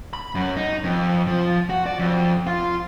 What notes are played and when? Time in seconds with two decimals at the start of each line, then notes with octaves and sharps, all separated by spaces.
0.13 B5
0.35 F#2
0.57 D#4
0.84 F2
1.27 F3
1.70 F#4
1.86 D5
1.99 F2
2.47 F4